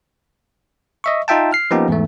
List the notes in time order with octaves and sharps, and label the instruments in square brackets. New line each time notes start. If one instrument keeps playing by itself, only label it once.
[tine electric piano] D#5 E5 C#6
D#4 F4 E5 G5 A5
F6 C7
F3 A#3 B3 C#4 D#4 G4
E2 G#2 E3 A3